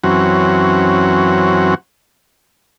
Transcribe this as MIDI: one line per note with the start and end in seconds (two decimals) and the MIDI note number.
0.04 1.75 42
0.04 1.75 52
0.04 1.75 54
0.04 1.75 60
0.04 1.75 61
0.04 1.75 66